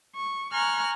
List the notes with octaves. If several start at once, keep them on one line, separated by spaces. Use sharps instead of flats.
C#6
G#5 A#5 C#6 F6 F#6